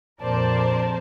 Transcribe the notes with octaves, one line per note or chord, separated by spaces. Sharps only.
A#1 F2 A#4 C5 D5 A5